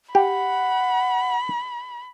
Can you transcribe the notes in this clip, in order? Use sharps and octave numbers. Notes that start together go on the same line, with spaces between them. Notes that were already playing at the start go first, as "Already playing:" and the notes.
G4 F#5 B5